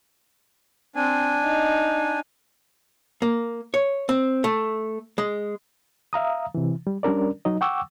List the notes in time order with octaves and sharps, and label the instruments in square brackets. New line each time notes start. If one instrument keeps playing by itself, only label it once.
[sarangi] C4 [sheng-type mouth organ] D4 G#5
[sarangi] D#4
[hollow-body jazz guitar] A#3
C#5
C4
A3
G#3
[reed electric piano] E5 F5 A#5 D#6
C3 E3
G3
G3 C#4 D4 A#4 D5
F#3 D#4 D#5
F#5 G5 C#6 D6 E6